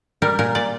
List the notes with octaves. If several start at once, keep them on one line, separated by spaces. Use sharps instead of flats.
G3 A#4
A#2 A#4
A#2 D5